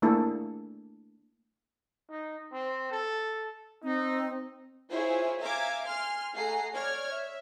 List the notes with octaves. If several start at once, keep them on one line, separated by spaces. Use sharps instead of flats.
A3 A#3 D4 E4 G#4 A4
D#4
C4
A4
C4 D#4
E4 F4 G#4 C5 C#5 E5
E5 F5 G#5 A#5 D6 G#6
G#5 C6 F6
A3 G#4 F#5 A#5 C7
C#5 D5 F6 G#6
E5